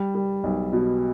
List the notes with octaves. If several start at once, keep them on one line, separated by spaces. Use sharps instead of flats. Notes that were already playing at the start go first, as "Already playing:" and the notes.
Already playing: G3
G3
B1
B2